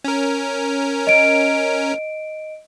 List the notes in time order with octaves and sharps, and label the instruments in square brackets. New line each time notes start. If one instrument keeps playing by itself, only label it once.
[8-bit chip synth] C#4 A#4
[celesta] D#5 D7